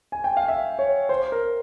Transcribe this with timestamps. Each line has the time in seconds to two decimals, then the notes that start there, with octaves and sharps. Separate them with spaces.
0.12 G#5
0.24 G5
0.37 F5
0.48 E5
0.79 C#5
1.09 C5
1.32 A#4